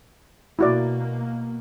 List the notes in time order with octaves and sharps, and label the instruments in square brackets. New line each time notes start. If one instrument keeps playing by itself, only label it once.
[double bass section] B2 A#3 [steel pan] E4 F#4 D5